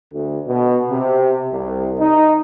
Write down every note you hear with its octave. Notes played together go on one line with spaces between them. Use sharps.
D2
B2
C3
C2
D#4